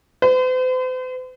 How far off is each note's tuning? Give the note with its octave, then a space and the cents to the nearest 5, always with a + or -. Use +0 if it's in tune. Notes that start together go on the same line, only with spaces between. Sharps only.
C5 -45